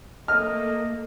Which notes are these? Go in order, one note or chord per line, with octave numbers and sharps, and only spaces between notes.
A3 A#3 D#5 F6